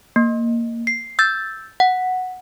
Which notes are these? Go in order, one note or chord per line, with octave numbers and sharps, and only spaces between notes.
A#3
C7
E6 G6 A6
F#5